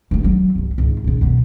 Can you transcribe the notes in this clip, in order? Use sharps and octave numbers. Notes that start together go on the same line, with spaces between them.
G2 A3
F#3
G1 C2
G#1 C#2
A#2 C#3
F#2 B2